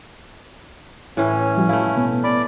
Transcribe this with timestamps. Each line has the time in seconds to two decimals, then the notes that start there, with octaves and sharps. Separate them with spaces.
1.17 A2 E3 C#4
1.57 F3 G3 F#4
1.69 A3 E4 F5
1.96 B2 B3
2.24 D5 B5